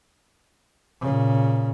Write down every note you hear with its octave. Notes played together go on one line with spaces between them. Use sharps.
A#2 C#3